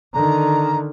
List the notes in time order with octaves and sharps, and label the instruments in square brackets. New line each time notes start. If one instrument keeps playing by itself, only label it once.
[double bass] D3 D#3 [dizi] A#5